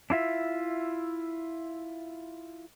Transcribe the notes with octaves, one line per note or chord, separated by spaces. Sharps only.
D4 E4 F4 E5